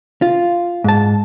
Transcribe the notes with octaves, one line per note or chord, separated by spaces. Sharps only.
F4
G#2 A5